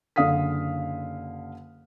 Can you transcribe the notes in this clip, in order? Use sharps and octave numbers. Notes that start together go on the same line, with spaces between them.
F#1 D3 F5 D#6 B6